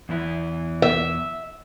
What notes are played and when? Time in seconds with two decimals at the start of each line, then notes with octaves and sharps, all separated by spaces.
0.09 E2 E3 E4
0.82 E5